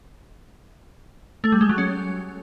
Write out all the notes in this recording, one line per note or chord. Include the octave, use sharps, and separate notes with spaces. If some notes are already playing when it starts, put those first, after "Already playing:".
A3
G3
G#3
F#3
C#4